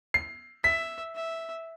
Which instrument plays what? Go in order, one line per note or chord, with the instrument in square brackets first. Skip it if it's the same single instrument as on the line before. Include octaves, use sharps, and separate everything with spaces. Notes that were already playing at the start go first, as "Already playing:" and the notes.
[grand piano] C7
[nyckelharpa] E5 [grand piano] B6
[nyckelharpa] E5